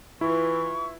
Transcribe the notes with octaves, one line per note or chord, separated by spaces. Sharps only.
E3 E4 F4 B4 C#6